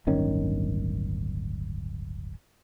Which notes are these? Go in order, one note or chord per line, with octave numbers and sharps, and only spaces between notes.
D1 G1 D#3 C#4